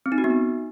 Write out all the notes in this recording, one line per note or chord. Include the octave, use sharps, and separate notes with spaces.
C4
D#4
F#4
B3
D#4